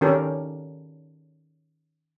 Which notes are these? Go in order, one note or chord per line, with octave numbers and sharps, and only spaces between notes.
D#3 C#4 G4 A4 A#4